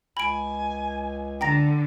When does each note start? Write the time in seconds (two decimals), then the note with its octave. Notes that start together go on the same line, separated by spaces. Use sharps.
0.17 C#2 G#5 B5 D7
1.41 D3 G5 A#5 A#6